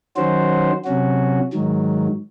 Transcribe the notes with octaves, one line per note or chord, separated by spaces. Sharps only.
D#3 F#3 C#4 F#4 C5
C3 F#3 C#4 F#4
G#2 D#3 F#3